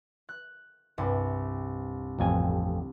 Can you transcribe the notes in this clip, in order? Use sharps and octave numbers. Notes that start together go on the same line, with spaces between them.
F#6
C2 G2
A1 F2 G#5